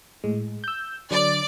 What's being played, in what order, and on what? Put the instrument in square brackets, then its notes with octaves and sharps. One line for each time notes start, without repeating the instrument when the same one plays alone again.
[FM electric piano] A2 G#3
E6 G6
[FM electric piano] D3 F#3 [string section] D5